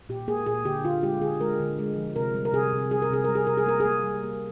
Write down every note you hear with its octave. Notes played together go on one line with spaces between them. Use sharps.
A#2 G4
A#3 G#4
A#2 G#4
D3 G4
D3 F4
G#3 G4
D3 G#4
G#3 A#4
D3
G#3
F3
C3 A#4
G3
A#4
C3 G#4
C3
G3 G#4
A#4
C3 G#4
G3 A#4
G#4
C3 A#4
G#4
A#3 A#4
G#4
A#3
G3
A#3